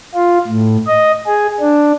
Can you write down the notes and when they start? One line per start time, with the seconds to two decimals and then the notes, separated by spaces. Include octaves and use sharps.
0.14 F4
0.48 A2
0.87 D#5
1.27 G#4
1.60 D4